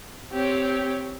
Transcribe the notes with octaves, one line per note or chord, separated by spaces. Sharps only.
C4 G4 C#5